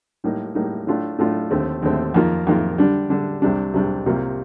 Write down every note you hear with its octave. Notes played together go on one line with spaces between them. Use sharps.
A2 G3 A#3 D#4
A2 G3 A#3 D#4
A2 A3 D4 F4
A2 A3 D4 F4
D#2 D3 A3 C4
D#2 D3 A3 C4
F2 D#3 A#3 F4
F2 D#3 A#3 F4
D3 G3 D4
D3 G3 D4
C2 C3 G3 D4
C2 C3 G3 D4
C2 C3 G3 A#3 F4